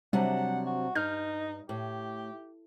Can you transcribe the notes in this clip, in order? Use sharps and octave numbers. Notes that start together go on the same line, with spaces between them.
C3 F#3 G3 D4 F#5
F#4
G2 D#4 F6 G6
A2 G4